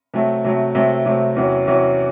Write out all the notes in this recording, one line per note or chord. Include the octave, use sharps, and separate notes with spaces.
C3 F#3 A3
C3 F#3 A3
C3 F#3 A3 C4
C3 F#3 A3 C4
E2 C3 F#3 C#4
E2 C3 F#3 C#4